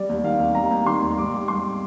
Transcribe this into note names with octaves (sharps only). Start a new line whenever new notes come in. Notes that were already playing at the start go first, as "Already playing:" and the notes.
Already playing: G3 D5
D#2
D#3 F5
D#2
G3 A#5
D#2
D#3 C6
D#2
G#2 D6
G3
G3 C6